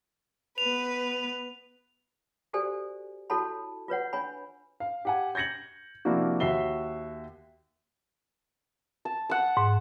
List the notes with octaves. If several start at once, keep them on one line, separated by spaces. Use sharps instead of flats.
B3 B4 F7
F#4 G4 A4 C5 D5 G#5
E4 F#4 A4 C#5 A5 B5
F4 B4 C#5 F#5
D4 C#5 G#5 B5
F5
G4 F#5 G#5
G6 G#6 A#6 C#7 F#7
C3 F3 A#3 D4 E4 F#4
D#2 F#4 E5 C7 G7
A5
F#5 A5
G#2